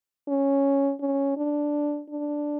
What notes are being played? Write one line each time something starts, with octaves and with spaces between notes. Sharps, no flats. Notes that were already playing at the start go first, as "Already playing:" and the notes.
C#4
C#4
D4
D4